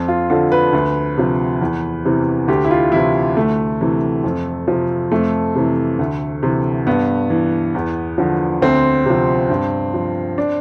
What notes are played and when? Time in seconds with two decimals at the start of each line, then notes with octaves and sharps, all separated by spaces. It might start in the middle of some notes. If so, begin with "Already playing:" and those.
Already playing: F2
0.08 F4
0.30 D3 F3 A4
0.52 B4
0.73 D2
1.18 C3 F3
1.61 E2
2.05 C3 E3
2.48 D2 G4
2.65 E4
2.71 F4
2.92 C3 E3 E4
3.37 D2 A3
3.81 C3 E3
4.24 F2
4.68 C3 F3
5.12 F2 A3
5.55 C3 E3
5.99 D2
6.43 C3 E3
6.87 G2 B3
7.30 E3
7.75 E2
8.18 D3 F3
8.62 D2 C4
9.06 C3 F3
9.50 G2
9.94 F3
10.38 D4